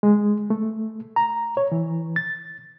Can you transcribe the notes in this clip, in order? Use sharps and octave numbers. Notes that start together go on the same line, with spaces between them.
G#3
A3
A#5
C#5
E3
A6